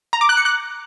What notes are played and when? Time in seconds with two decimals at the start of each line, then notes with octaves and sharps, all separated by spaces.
0.13 A#5
0.21 D6
0.29 F#6
0.37 C#7
0.45 F#6